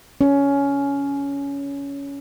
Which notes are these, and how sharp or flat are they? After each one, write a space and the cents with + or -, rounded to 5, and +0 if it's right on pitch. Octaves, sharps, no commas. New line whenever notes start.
C#4 +15